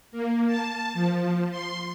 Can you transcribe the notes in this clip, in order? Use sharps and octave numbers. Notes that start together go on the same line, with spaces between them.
A#3
A5
F3
C6